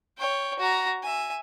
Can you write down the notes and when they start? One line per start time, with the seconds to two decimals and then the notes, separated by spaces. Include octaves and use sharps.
0.18 C#5 G5
0.59 F#4 A#5
1.03 E5 G#5